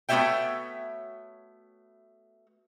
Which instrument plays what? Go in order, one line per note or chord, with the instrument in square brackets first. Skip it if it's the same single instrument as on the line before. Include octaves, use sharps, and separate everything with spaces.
[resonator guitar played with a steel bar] A3 B3 F#4 C#5 E5 G5